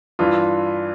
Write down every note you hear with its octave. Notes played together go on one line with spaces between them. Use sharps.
G2 E3 F4